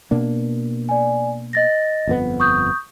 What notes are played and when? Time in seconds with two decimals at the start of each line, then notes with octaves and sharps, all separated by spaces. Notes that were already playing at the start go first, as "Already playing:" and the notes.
0.11 B2 A#3 D4
0.89 D5 G#5
1.53 D#5 A6 A#6
2.07 G1 F2 B3
2.40 C#6 D#6 G6